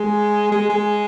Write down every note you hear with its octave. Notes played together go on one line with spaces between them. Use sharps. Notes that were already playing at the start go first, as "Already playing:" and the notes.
Already playing: G#3
G#3
G#3